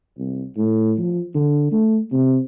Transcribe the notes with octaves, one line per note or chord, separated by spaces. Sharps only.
C2
A2
F3
D3
A3
C3